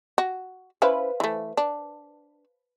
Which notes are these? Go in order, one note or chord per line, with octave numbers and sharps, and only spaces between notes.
F#4
C#4 E4 B4 C5 F5
E3 A3
D4